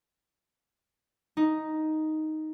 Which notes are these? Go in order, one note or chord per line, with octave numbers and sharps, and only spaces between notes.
D#4